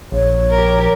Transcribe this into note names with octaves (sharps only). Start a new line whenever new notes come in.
A#1 C#5
G4 A#4